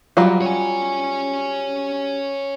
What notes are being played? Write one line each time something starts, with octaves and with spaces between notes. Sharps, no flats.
F#3 G3 F4
C#5 G#5